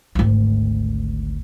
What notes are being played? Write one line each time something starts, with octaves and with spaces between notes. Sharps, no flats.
G#1 D2